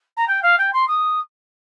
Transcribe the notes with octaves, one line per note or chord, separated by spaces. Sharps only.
A#5
G5
F5
G5
C6
D#6